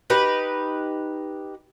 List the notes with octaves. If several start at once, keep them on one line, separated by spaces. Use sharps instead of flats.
D#4 G4 B4